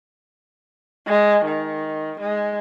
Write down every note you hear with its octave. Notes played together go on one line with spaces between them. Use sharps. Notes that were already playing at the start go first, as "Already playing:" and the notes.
G#3
D#3
G#3